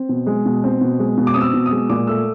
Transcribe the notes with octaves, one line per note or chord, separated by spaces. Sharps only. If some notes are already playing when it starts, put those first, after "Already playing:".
Already playing: C4
B2
G#3
B2
C4
B2
G#3
B2
D6
C4 D#6
E6
B2
D#6
G#3
A#2 D6
A3 E6